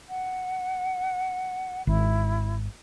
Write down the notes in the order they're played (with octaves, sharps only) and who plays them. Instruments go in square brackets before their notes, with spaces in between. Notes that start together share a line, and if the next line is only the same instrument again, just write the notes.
[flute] F#5
[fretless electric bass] G#1 [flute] E4